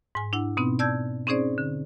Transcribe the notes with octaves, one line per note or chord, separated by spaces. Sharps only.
G#2 G#5
D4 E4 F#5
B2 B3 C4 D#4
D5 A5 E6 G6 G#6
C4 C#4 D#4 G#4 C5 D5
D3